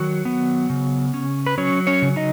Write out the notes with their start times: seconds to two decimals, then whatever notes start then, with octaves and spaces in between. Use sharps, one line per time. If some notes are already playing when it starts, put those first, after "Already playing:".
Already playing: D#3 F#3 F#4
0.25 B3
0.70 C#3
1.14 C#4
1.46 B4
1.58 F#3 C#4 C#5
1.87 C#4 C#5
2.02 C#3
2.16 D#4 D#5